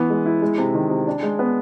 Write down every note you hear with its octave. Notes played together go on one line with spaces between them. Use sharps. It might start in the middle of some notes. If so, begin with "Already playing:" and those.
Already playing: E3 B3
G#3
E4
G#3
C3
D#3
C3
D4
G#3
B3